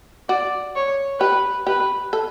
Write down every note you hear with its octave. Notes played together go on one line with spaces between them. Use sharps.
F#4 D5
C#5
G4 B4
G4 B4
A4